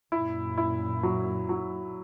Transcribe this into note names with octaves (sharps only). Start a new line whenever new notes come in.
F#2 A#2 E4
E4
F#3
F#3